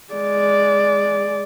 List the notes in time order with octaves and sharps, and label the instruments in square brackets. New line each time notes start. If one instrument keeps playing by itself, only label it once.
[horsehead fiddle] G#3 D5